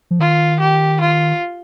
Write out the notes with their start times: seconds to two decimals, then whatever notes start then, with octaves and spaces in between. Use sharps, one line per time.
0.11 F3
0.20 D#3 F4
0.60 G4
1.01 F4